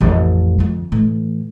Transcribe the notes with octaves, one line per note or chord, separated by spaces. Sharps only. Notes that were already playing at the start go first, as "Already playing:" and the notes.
A1 F2
F2 D3
A2 E3